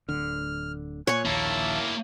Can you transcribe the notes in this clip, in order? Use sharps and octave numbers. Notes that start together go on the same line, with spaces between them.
D1 D3 F6
A#2 C#5 G#5 C#6 F#6
A#1 D#2 A#3 E4 E5 A5